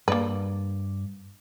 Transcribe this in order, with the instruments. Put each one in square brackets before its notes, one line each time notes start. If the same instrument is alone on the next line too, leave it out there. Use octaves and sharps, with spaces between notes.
[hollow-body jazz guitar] G2 D5 [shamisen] A#3 B4